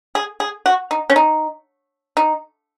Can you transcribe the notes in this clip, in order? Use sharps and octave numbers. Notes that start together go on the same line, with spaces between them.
G#4
G#4
F#4
D#4
C#4
D#4
D#4